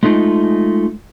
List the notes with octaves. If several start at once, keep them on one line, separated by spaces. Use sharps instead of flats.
G#3 A3 D#4 F4